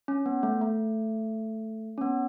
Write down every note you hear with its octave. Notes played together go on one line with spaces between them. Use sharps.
C#4
B3
A3
A3
C#4
B3